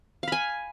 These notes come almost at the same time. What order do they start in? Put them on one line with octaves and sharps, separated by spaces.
F5 B5 G#5